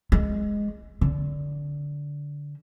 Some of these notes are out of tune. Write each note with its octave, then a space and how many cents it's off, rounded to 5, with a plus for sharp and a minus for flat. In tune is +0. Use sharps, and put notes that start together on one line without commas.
G#3 -5
D3 -15